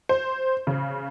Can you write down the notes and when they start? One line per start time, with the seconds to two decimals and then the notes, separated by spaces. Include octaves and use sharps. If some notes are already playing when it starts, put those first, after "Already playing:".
0.09 C5
0.67 C#3